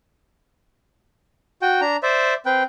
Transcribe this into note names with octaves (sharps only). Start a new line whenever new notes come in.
F#4 G5
D4 A#5
C5 D5 E5
C4 B4 G5